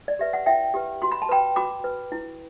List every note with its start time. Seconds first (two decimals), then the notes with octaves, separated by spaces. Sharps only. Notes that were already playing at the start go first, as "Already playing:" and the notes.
0.08 D5
0.19 G4 B4 E5
0.33 F#5
0.46 E4 E5 G5
0.74 G4 B4
1.02 F#4 C6
1.12 B5
1.22 A5
1.29 B4 G5 B5
1.56 F#4 B5 D6
1.84 B4
2.12 E4